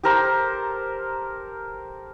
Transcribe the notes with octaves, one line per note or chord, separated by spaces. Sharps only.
G4 A4 A#4 C5